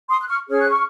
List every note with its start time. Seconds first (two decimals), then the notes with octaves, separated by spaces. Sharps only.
0.08 C6 D#6
0.21 F#6
0.29 C#6 F6
0.49 C#4 G#4 C#5 F6
0.59 F#6
0.69 C#6 F6